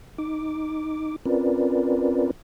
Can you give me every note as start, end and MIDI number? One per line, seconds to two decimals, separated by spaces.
0.18 1.16 63
0.18 1.16 86
1.26 2.31 60
1.26 2.31 61
1.26 2.31 65
1.26 2.31 70
1.26 2.31 71
1.26 2.31 74